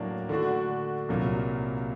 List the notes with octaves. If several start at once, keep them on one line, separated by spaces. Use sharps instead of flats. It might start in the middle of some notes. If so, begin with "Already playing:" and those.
Already playing: A2 F#3 A#3 D4
D3 A3 D4 F#4
C2 A#2 F#3 A#3